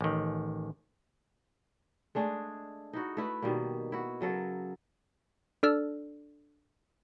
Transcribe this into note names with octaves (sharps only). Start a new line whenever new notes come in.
A1 D#3
G#3 A3 D4 G#4
D#4 E4 F#4
A3 E4 B4
B2 D#3 G3 A#3
E4 F#4
C#3 F#3 A4 A#4
D4 A4 D5 E6 F6